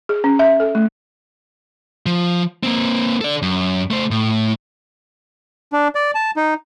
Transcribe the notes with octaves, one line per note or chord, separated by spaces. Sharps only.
G#4
C#4
E5
A4
A3
F3
A#3 C4
A4 D5
F#2
A3 C5
A2
D4
D5
A5
D#4